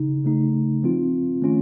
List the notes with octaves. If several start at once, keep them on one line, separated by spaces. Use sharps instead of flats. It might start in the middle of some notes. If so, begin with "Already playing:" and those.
Already playing: C#3 D#4
C#3 A3 D#4
F3 C4 F4
D#3 A3 C#4 F4